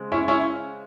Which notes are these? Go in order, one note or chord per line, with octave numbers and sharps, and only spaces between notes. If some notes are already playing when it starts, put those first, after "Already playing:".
Already playing: C#3 G#3 C4
C#4 E4
C#4 E4